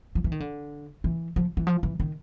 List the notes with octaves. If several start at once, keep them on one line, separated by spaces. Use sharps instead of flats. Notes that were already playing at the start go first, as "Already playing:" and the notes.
F3
E3
D#3
D3
E3
F3
E3
F3
E3
D#3